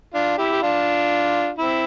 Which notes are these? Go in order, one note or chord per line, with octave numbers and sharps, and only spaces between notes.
D4 F4
E4 G4
G4
D4 F4
C4 E4